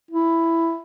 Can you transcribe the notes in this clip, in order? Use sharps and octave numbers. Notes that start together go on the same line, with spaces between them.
E4